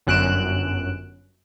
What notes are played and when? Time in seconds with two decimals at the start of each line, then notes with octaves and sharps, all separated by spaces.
0.07 G1 F#2 F#6 D7 E7